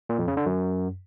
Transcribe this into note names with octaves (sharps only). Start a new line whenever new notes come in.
A#2
F2
C#3
D3
F#2